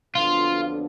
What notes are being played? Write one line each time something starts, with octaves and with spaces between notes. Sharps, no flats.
F2 D3 F#3 B3 D4 F4